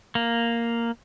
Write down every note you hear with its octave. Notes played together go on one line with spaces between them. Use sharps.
A#3